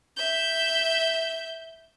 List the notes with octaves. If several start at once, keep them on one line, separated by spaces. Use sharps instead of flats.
E5 G6